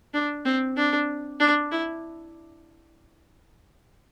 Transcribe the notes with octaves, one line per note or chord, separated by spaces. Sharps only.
D4
C4
D4
D4
E4